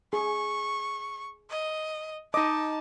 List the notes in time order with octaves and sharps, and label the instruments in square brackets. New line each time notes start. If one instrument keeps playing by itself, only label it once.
[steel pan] G#4 [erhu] C#6
[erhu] D#5
[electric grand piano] D#4 D6 [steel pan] D#5 [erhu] A5